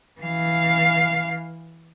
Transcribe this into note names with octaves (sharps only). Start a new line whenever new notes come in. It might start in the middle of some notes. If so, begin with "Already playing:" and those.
E3 F5